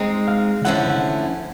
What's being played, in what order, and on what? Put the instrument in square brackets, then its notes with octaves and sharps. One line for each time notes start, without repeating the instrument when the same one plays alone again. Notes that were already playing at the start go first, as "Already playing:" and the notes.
Already playing: [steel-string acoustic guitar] G#3 C4 D#4
[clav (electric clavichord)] F5
[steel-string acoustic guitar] D3 F3 A3 C#4 E4 [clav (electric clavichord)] F#5
[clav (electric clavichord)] F#5
F#5